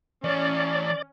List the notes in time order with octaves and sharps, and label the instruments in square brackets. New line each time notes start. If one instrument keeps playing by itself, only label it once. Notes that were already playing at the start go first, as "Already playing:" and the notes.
[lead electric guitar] E3 C#5 [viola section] C#4 [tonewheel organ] D5